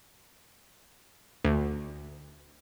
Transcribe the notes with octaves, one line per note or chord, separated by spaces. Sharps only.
D2